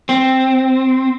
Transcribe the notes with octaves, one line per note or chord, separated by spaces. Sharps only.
C4